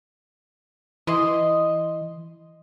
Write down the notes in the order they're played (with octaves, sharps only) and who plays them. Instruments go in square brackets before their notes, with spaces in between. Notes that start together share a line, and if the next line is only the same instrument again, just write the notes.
[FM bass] E3 [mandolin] D#5 C6